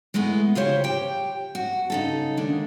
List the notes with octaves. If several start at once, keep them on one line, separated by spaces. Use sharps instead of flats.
G#3 A3 B3 E4
C#3 F4 G4 C5 C#5
G4 G5
F#4
C#3 D#4 A4
D#2 D3 G#3 D4